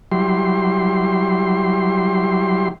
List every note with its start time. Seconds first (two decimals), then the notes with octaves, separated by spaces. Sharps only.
0.12 F#3 G3 E4 G4 C6